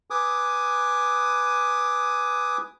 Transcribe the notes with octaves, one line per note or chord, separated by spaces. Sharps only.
B4 G#5 D6 D#6